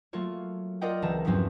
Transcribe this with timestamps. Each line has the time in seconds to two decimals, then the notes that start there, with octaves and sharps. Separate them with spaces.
0.13 F#3 A3 A#3 F4 C#5
0.81 F4 A#4 D5 D#5 F#5 G5
1.02 C#2 E3 C4 A5 A#5
1.25 E2 G2 F3 F#3 C4 C#4